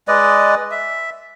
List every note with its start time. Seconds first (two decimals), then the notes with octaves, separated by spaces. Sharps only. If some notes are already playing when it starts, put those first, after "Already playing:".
0.08 G#3 B4 D5 D#5
0.71 E5